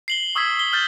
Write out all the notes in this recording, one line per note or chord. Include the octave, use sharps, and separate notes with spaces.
C7 F#7 G7
C#6 D#6 E6 G#6 B6
G7
F6 G6 A6